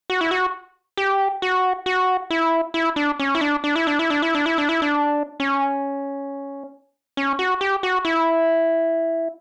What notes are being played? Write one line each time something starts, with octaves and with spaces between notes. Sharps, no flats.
F#4
E4
F#4
G4
F#4
F#4
E4
E4
D4
C#4
E4
D4
D4
E4
D4
E4
D4
E4
D4
E4
D4
E4
D4
C#4
C#4
F#4
G4
F#4
E4